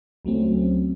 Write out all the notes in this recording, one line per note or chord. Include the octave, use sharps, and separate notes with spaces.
C#2 F#3 A3 C4 C#4